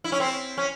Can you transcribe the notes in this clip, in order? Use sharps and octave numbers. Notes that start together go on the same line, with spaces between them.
E4
C#4
C4 E4
C#4